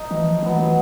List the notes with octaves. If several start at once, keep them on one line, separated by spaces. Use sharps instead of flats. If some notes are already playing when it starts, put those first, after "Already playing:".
Already playing: D#4
A2 E3
F3
E3 F#3 B3
E3